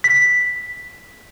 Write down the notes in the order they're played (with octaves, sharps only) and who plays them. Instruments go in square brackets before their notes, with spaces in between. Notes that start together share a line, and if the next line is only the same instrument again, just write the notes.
[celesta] B6